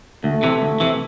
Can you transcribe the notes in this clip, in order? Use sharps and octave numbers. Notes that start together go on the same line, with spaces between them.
D2 A3
C3 E3
D2
C3 E3